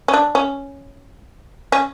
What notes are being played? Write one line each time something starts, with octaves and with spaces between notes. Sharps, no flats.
C#4
D4
C#4
C#4